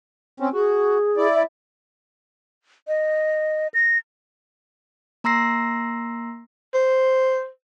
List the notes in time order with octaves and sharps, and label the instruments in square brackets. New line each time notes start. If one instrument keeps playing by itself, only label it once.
[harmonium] C4 C#4
[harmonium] F#4 [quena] G#4
[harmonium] E4 D5
[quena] E5
[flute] D#5
A#6
[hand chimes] A#3 A#5 C6 E6 A#6 C7
[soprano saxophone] C5